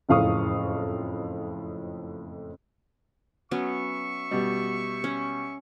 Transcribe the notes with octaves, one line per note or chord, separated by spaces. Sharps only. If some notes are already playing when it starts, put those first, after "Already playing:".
F#1 F2 A2 F5 C#6 D#6
F#3 B3 C#4 E5 C#6
B2 G3
C#4